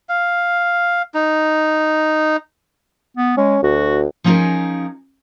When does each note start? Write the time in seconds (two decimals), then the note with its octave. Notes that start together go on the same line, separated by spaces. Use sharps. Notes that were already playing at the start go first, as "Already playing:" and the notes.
0.09 F5
1.14 D#4
3.17 B3
3.37 G#3 C#4
3.63 D2 F#4
4.24 F3 C#4 D#4 F#4 G#4 A#4